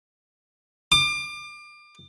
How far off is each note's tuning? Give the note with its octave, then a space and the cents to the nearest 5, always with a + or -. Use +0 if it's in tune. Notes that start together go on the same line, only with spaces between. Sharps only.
D6 +30